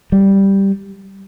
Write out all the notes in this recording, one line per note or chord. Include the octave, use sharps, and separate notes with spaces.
G3